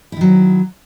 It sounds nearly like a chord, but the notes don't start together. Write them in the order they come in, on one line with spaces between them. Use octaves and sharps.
E4 D#3 F#3